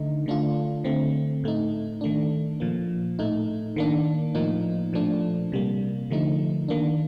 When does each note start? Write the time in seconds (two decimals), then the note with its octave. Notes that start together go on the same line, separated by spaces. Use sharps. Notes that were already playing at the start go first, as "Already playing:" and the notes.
Already playing: D3 A3 D#4
0.26 D3 A3 D4 F4
0.84 D3 A3 C4
1.44 A2 A3 D#4
2.01 D#3 A3 D4
2.60 A#2 F3 A#3
3.19 A2 A3 D#4
3.76 D#3 A#3 D4
4.35 A2 F3 A#3 D#4
4.93 A#2 F3 A3 D4
5.52 C3 G3 A#3
6.10 D3 F3 A3 D#4
6.68 D#3 A#3 D4